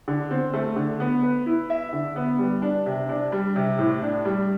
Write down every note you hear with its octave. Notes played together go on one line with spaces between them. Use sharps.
D3
C4
A3
D3
B3
B4
E4
E5
D3
B3
G3
D4
C3
D4
G3
C3
A2
D4
G3